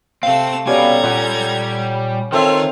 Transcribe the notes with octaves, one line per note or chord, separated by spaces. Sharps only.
C3 A3 C4 F5 E6
B2 G3 C#4 G4 A4 A#5 G#6
A#2 G3 G4 F#5
D#3 C4 F4 A4 C#5 E5